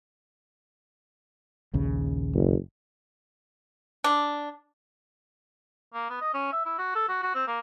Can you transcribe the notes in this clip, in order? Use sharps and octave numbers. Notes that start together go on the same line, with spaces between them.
A#1 D#2 C#3
F#1
D4
A#3
B3
D#5
C#4
E5
E4
F#4
A4
F#4
F#4
C4
A#3